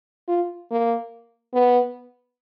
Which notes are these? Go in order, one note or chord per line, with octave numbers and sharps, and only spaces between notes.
F4
A#3
B3